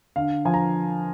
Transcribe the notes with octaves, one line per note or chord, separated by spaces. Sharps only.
D3 F5
F3 G#5
A#5